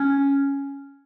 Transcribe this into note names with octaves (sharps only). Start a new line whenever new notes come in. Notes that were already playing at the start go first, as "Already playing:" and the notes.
Already playing: C#4